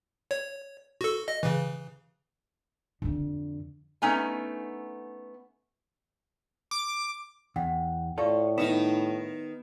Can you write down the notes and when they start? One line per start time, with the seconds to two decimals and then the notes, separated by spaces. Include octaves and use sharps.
0.31 C#5
1.01 F#4 A4
1.28 D#5
1.43 C#3 E3
3.02 F2 D3
4.02 A3 B3 C#4 D#4 G#5
6.71 D6
7.56 E2 F#5 G5
8.18 A2 F4 A4 D5 F5 C#6
8.58 D#3 B3 D#4 E7